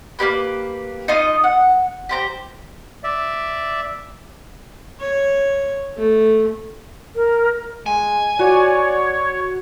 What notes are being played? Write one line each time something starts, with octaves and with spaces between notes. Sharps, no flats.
A#3 C4 G4 B4
D#4 F4 D#5
F#5
G4 C5 A#5
D5 E5
C#5
A3
A#4
G#3 G#5
F#4 C#5 D5